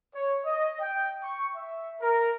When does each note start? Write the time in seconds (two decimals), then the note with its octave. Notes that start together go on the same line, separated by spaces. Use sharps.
0.15 C#5
0.45 D#5
0.81 G5
1.23 C#6
1.56 E5
2.02 A#4